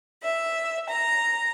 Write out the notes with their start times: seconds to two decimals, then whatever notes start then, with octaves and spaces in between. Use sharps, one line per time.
0.22 E5
0.89 A#5